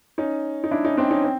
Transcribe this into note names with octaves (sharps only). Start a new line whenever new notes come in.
C#4 D#4
D#4
D4 E4
C#4 D#4
C4 D4
C#4 D#4
C4